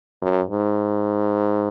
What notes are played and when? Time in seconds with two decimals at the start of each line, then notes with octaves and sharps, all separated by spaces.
0.22 F#2
0.51 G#2